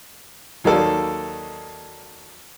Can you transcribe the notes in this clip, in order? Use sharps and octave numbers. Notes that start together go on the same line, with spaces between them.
D#2 F#3 A#3 D#4 A4 D5